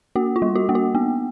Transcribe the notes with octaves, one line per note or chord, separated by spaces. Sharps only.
A#3 F#4
F4
G3
F#4
A#3
F#4
B3